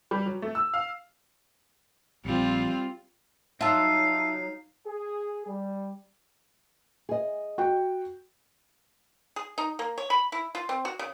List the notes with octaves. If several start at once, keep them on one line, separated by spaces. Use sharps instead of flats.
G3
F#3
A3
E6
F5
A#1 F3 G3 C4 F4
F#3 D#4 F4 E5 F5 A5 E6
G#4
G3
G#4 D#5
F#4 G5
G#4
D#4
A#3
C#5
B5
E4
F4
C4
F#4
C#3